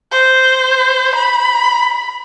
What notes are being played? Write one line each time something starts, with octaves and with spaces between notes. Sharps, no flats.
C5
B5